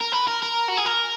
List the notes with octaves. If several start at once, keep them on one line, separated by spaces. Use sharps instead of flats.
A#4
B4
A#4
A#4
F#4
G#4
A#4